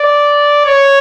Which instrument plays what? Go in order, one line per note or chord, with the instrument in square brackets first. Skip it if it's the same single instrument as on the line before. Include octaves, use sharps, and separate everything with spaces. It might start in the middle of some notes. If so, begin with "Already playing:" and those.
Already playing: [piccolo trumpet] D5
C#5